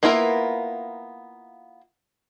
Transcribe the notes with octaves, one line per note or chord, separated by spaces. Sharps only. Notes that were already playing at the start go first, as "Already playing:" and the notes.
A#3 B3 E4 F4 A#4